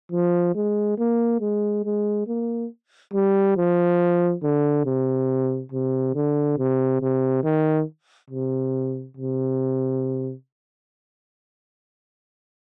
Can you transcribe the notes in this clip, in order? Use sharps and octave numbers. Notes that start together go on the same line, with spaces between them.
F3
G#3
A#3
G#3
G#3
A#3
G3
F3
D3
C3
C3
D3
C3
C3
D#3
C3
C3